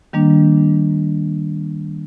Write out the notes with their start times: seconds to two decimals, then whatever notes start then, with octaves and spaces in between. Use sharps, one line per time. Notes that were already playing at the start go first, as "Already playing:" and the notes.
0.13 D#3 G3 A#3 D4